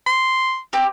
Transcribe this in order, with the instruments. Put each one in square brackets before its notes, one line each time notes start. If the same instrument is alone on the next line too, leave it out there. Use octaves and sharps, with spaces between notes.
[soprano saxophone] C6
[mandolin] C4 G4